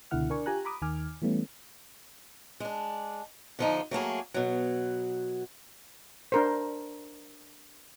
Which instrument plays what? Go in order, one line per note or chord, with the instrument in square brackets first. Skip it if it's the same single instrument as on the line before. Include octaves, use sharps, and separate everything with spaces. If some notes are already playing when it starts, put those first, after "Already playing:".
[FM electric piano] C#2 B2 D3 E4 F#5 F6
D4 A#4 D5 G#5 C#6
F4 G4 G#5 A#5 F#6
A#5 B5 D6 D#6
D#2 D#3 G#5 D6 F6
E3 G3 A3 B3 C#4
[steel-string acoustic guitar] G#3 D4
D3 F3 D#4
F#3 A3 A#3 G#4
B2 F#3
[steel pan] D4 A#4 C5